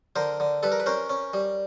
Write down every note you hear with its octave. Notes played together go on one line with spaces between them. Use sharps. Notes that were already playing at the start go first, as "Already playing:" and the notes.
D3 A#4 C5
D3
G3 A4 B4
A#4
B4
C#4 A#4 C5
C#4
G3